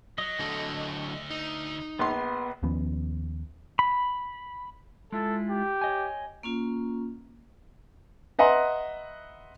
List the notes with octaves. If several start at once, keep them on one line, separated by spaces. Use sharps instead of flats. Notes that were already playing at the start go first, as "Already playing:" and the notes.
F#3 D#5
D2 D3 F#3 A3 A4
D#4
A#1 B3 C6
D#2 F3 B3 C#4
B5
G#3 E4 F4 A4
G4
C#5 D#5 G#5
A#3 C#4 F4
B4 D#5 E5 F#5 A#5 C6